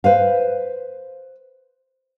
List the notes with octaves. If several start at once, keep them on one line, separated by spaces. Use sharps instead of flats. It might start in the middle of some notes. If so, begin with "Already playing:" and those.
B4 C5 F5